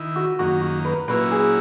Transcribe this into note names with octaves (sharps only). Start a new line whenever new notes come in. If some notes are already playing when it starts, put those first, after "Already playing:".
Already playing: D#3 E4
F#4
F#2 D#3 A#3 F#4
F#4
B4
A#2 F#3 A#3 C#4 E4 B4
G#4